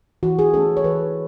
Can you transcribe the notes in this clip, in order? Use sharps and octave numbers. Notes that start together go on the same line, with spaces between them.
E3 F#4
G#4
A3 C#4 A4
C#5
E3 B4